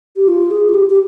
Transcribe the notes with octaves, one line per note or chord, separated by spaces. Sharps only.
G4
F4
G#4
F4
G4
G4